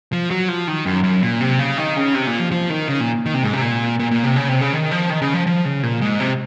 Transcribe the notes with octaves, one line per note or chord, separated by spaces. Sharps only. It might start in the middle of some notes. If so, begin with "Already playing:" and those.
F3
F#3
F3
D#3
F#2
F#2
A#2
C3
C#3
D#3
C#3
C3
A#2
F3
F3
D#3
C#3
A#2
D#3
C3
G#2
C3
A#2
A#2
A#2
C3
C#3
C3
C#3
D#3
F3
D#3
C#3
F3
F3
C#3
A#2
G#2
C3